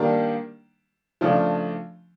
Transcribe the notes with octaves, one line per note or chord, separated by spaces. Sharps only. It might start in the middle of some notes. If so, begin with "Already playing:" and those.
Already playing: D#3 G3 A#3 D4
C#3 F3 A3 D4